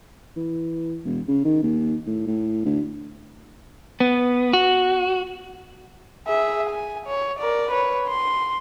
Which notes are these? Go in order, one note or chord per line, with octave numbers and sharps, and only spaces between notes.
E3
E1
C#3
D#3
D#2
A2
A2
D2
B3
F#4
G#4 E5
G#5
C#5
A#4 D5
B4 C#5
C6